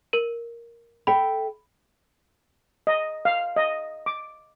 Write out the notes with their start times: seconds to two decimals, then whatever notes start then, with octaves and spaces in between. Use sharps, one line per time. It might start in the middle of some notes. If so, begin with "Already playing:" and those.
0.13 A#4 D#7
1.07 A4 E5 G5 B5
2.87 D#5
3.25 F5
3.56 D#5
4.06 D6